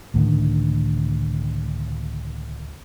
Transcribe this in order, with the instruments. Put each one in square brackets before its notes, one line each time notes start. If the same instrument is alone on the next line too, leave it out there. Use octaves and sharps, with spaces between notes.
[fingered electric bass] C#2 A2 D3 D#3